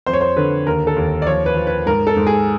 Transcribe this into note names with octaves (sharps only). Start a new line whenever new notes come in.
F2 C5
C#5
C5
D3 B4
D#2 A#4
A4
D#2
D5
F3 C#5
B4
F3
B4
G#2 A#4
A4
G#2
G#4